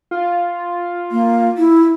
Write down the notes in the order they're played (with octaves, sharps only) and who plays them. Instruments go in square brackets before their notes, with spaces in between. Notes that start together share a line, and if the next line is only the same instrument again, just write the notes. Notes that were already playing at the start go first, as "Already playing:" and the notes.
[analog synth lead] F4
[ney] A#3
E4